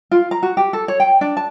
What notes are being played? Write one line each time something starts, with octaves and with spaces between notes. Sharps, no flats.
F4
A#5
F#4
G4
A4
C#5
G5
D4
A5